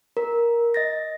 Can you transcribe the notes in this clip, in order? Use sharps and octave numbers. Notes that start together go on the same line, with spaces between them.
A#4
D#5 A6 A#6